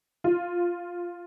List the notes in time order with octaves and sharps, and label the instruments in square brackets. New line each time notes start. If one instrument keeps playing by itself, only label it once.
[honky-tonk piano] F4